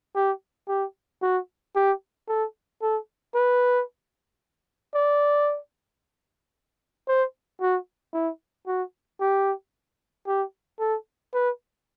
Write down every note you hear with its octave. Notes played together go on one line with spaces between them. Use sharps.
G4
G4
F#4
G4
A4
A4
B4
D5
C5
F#4
E4
F#4
G4
G4
A4
B4